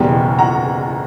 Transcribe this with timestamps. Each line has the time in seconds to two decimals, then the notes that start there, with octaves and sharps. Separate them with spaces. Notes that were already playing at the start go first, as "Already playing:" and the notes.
Already playing: F#1 E2 B2 G3 G5
0.39 F#5 A#5